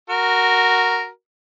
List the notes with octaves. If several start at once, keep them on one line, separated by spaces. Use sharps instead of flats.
F#4 A#4